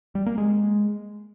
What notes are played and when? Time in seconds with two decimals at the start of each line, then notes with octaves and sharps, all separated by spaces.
0.15 G3
0.26 A#3
0.38 G#3